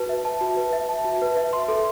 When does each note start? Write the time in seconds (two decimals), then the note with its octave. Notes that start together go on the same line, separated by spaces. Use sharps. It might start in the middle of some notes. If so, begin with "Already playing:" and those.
Already playing: F#4 B4 A5
0.09 E5
0.25 A5
0.41 F#4
0.57 B4
0.73 E5
0.89 A5
1.05 F#4
1.22 B4
1.37 E5
1.53 C6
1.68 A4